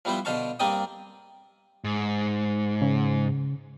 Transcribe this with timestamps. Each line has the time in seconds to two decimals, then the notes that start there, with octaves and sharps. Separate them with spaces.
0.05 F3 G3 B3 E4 C5
0.25 B2 D3 C5 F5 A5 C#6
0.59 G2 A#3 C4 D5 G5 D#6
1.84 G#2
2.82 C#3